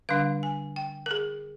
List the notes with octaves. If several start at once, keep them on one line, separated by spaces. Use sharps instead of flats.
D3 G3 D4 F5
G#5
G5
A#4
G#4